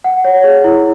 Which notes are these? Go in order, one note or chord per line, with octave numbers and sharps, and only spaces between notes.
F#5
C#5
G#4
E4